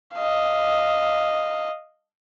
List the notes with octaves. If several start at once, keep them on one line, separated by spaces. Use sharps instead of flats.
D#5 F5